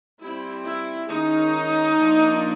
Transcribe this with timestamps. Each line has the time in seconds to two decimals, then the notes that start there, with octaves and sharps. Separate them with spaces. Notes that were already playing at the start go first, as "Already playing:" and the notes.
0.21 G3 C4 E4
0.65 E4
1.09 D#3 G#3 C#4 D#4
1.97 F3 A#3 D4